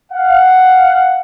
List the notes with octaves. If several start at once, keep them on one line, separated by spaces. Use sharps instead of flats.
F5 F#5